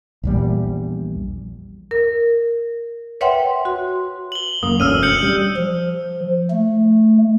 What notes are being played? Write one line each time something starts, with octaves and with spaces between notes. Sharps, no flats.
A#1 E2 G3
A#4
B4 C#5 E5 F#5 G5 C6
F#4 C6
F#7 G7
F#1 F#2 A#3 D#6
E1 D2 C#4 E6 F6 D#7
G6 C#7 F#7
G3
F3
A3